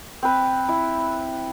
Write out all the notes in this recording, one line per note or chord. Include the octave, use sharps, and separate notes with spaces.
C4 B4
E4